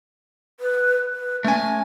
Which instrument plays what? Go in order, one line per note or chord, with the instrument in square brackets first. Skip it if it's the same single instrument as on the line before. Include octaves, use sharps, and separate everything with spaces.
[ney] B4
B4
[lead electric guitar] A3 G#5 [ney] C#4